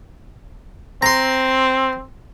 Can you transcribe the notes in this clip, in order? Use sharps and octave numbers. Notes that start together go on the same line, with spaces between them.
C4 A#5 C6